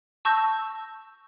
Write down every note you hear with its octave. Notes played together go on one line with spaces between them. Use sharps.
A5 C#6 E6 G6 A#6